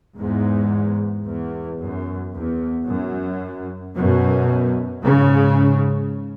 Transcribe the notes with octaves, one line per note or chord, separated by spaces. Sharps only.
E2 G#2
E2
F#2
E2
F#2
F#2 B2
G#2 C#3